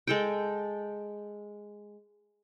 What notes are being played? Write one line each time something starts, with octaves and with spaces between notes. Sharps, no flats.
G#3 A4 G5